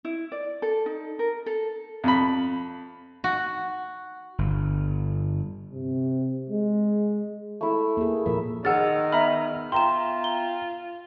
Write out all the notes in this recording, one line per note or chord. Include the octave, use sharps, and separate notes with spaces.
E4
D5
A4
D#4
A#4
A4
F2 B5
F#4
G1
C3
G#3
A3 E4
A#3 G#4
A#2 F3 A#4 E5
D#3 G#4 F#5 E6 F6 A6
B3 E5 A#5 B5 F6
F4 G5 A#5 C6 E7
G7